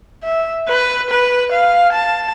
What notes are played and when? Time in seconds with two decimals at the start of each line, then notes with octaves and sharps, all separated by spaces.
0.23 E5
0.68 B4
1.10 B4
1.52 F5
1.93 A5